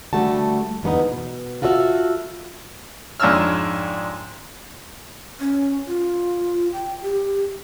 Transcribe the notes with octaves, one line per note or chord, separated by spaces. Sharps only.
D2 G2 G3 A3 F#4 A5
E2 D3 A3 B3 D#4
B2
F4 F#4 A4 C5 E5 F5
F2 G#2 D4 C#5 E6 F6
C#4
F4
G5
G4